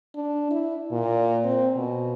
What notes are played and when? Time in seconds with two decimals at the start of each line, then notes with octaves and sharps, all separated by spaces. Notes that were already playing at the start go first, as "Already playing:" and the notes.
0.15 D4
0.51 E4
0.91 A#2
1.44 C4
1.76 B2